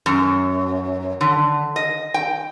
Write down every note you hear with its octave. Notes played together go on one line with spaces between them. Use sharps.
F#2
D3
D#5
G5